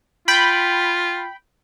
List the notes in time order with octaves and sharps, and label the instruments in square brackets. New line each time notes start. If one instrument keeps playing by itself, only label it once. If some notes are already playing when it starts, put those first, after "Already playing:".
[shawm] F4 [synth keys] G5 B5